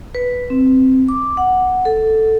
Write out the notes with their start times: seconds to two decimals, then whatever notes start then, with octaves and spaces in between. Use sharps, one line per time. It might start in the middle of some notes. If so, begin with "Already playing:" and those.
0.15 B4
0.50 C4
1.09 D6
1.37 F#5
1.85 A4